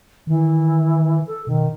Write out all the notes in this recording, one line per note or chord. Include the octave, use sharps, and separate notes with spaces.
D#3 E3
A4
B2 D#3